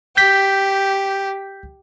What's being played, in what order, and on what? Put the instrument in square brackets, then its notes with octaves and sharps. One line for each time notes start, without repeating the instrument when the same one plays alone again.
[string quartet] G4 [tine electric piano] G6 B6